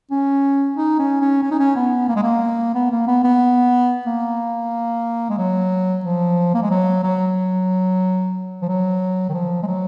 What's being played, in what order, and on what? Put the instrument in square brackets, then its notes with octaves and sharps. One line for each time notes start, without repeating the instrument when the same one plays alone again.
[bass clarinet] C#4
D#4
C#4
C#4
C#4
D#4
C#4
B3
A#3
G#3
A#3
B3
A#3
B3
B3
A#3
G#3
F#3
F3
A#3
G#3
F#3
F#3
F3
F#3
D#3
F3
G#3
F#3